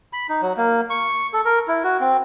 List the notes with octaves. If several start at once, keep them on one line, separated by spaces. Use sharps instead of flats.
B5
D#4
F#3
A#3
C#6
A4
A#4
E4
F#4
C4